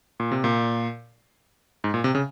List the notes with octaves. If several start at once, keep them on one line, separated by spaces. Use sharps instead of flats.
A#2
C3
A#2
G#2
A#2
C3
C#3